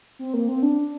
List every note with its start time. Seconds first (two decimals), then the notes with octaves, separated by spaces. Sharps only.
0.19 C4
0.34 A#3
0.48 C4
0.63 D4